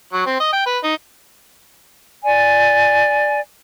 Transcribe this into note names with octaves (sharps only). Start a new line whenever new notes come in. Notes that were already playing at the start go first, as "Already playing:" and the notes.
F#3
C4
D#5
G5
B4
D#4
D5 G#5